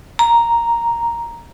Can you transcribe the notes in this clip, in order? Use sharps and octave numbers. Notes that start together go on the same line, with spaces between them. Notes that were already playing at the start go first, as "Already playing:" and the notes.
A#5